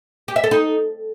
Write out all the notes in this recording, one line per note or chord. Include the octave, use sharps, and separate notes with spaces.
G4
E5
A4
D#4